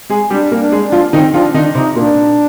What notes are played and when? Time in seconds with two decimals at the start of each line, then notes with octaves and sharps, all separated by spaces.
0.10 G#3 G#4
0.30 G3 D4 G4
0.51 A#3 A#4
0.58 D4
0.72 G#3 G#4
0.86 D4
0.92 F3 F4
1.13 D#3 C4 D#4
1.34 F3 D4 F4
1.54 D#3 D4 D#4
1.75 C3 C4 D#4
1.95 A#2 A#3 D4